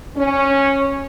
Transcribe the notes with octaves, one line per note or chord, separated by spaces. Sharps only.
C#4